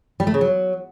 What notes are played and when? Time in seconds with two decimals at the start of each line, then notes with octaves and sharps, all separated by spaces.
0.20 G3
0.27 A3
0.34 C#3
0.41 F#3